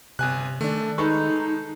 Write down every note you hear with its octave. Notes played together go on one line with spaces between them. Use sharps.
G1 C3 G#5 F#6
D#3 A3 D4
G#3 D#4 A4 B4 C#6